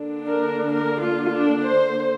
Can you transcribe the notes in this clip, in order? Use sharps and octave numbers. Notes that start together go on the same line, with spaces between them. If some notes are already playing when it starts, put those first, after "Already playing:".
Already playing: D3 A#3 D4
A#4
A#4
F4
D4
C5